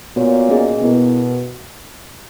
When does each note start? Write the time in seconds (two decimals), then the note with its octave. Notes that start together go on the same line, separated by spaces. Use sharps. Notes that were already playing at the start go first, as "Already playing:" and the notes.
0.16 A#2 B3 F#4 C#5
0.49 A#3 C#4 G#4 D#5
0.81 B2 B3 E4 A#4